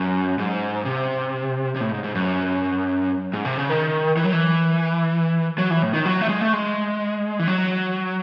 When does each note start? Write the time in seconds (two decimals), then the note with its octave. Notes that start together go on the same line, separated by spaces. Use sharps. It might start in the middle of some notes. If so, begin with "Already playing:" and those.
Already playing: F#2
0.39 G#2
0.85 C3
1.76 C3
1.81 A2
1.91 G#2
2.04 G#2
2.15 F#2
3.34 G#2
3.45 C3
3.58 C#3
3.69 D#3
4.17 E3
4.24 F#3
4.33 E3
5.58 F#3
5.71 E3
5.82 A2
5.94 D#3
6.05 F#3
6.21 A3
6.29 G#3
6.41 A3
6.53 G#3
7.39 E3
7.48 F#3